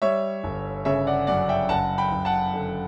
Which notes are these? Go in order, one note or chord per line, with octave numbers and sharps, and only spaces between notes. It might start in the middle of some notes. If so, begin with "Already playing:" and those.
G3 C#5 E5
G1
C#3 C#5 E5
D5 F#5
F#2 D5 F#5
E5 G5
F#1 F#5 A5
G5 B5
F#1
F#5 A5
D3